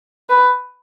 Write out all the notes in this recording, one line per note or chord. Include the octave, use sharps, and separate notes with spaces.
B4